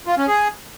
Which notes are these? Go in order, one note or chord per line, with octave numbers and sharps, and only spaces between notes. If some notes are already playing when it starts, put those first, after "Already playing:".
F4
C#4
G#4